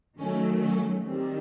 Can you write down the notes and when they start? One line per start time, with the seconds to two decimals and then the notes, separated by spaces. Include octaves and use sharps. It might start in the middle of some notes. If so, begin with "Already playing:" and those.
0.19 D#3 F#3 A3 C#4
0.63 C#4
1.07 D#3 G3 C4